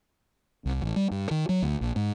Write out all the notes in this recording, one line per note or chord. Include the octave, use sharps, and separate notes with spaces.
C2
A1
G3
G2
D#3
F#3
D2
A#1
G#2